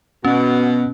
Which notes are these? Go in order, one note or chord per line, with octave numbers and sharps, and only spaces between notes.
B2 B3 C#4